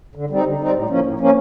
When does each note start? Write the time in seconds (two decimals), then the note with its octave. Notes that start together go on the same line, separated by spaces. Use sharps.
0.15 D3
0.30 G3 C4 D#4
0.45 D3
0.60 G3 C4 D#4
0.75 A2
0.90 F3 A#3 C#4
1.04 A2
1.19 F3 A#3 C#4